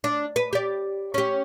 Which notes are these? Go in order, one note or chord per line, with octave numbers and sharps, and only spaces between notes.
D4
B4
G4 D5
C#4 G4